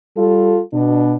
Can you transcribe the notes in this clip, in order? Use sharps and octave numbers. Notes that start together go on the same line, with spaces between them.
G3 F4 A4
B2 D4